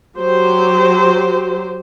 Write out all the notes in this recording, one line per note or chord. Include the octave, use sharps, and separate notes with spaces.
F#3 G4 C5